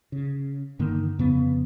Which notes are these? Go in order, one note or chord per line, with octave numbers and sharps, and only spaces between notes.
C#3
G2 D3 D#3 A#3
F2 C#3 F3 B3